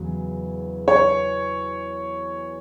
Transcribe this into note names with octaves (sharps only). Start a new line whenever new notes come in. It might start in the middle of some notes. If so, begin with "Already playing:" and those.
Already playing: E2 C#3 F#3
C#5